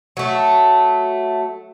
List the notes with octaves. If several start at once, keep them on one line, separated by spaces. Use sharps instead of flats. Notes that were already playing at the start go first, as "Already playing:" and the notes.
F#3 A3